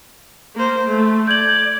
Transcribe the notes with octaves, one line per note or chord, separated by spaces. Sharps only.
A#3 C5
A3
D5 G6 G#6 F#7